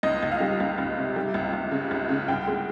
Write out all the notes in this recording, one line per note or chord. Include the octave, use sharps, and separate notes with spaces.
C#2 D#5
C#2
F5
G3
C#2
C#2
C3
G3
C#2
C#2
C#3
C#2
C#3
C2 G5
G#3